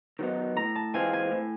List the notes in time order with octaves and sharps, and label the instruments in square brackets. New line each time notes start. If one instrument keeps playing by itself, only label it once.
[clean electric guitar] D#3 F#3 B3 D#4
[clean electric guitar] A2 [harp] A#5
[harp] A5
[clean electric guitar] E3 G#3 C4 F4 [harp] G#5
[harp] G#5
[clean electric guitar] A2